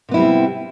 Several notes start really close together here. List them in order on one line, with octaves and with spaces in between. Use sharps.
C3 B3 E4 G3 C4